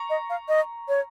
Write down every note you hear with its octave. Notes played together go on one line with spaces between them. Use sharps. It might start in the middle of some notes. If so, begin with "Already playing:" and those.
Already playing: A#5 C#6
D#5
F5
D#5
C#5